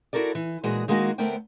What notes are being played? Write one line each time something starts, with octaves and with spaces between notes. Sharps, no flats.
E4 F#4 A4 A#4 D5
E3
A#2 E3 G#3 F#4 G#4
D#3 G#3 A#3 E4 F#4 G#4
D2 A3 B3 A#4 C5 G5